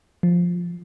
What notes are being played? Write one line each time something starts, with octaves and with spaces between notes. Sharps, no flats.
F3